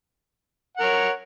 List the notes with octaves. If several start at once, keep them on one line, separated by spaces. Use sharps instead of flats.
A#4 C#5 F#5